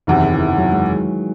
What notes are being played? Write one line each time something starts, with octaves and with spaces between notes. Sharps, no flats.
F#1 E2 C3 D#3
E3
F#3
G#3